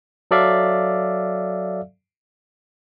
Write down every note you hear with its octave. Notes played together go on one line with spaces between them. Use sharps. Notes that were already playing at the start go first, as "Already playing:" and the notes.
F#3 A4 D5 E5 F5